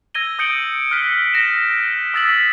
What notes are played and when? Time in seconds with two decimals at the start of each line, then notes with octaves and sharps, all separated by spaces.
0.14 E6 G#6 A#6 D#7 G7
0.39 D#6 G6 C#7 D7 F#7 G7
0.91 F6 F#6 B6 C#7
1.34 A#6 E7
2.14 D#6 E6 A6 B6 F#7